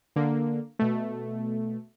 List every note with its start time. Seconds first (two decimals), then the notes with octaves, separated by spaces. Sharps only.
0.16 D3 A#3
0.79 B2 A3